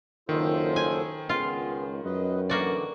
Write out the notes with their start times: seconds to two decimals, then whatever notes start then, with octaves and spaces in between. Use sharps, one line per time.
0.29 F#1 D#3 F4 A4 C5
0.76 G#5
1.29 C#2 G#3 B3 F4
2.05 F#2 B4 D#5
2.49 D3 E3 A#3 F#4 D5